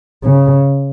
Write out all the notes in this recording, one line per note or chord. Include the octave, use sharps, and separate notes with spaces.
C#3